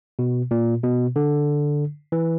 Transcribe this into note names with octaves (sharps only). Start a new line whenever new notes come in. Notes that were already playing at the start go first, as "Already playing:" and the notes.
B2
A#2
B2
D3
E3